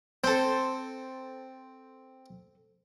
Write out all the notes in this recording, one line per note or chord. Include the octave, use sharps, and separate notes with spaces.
C4 A4 C5